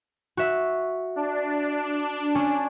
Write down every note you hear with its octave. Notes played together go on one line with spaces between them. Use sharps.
F#4 E5
D4
C#4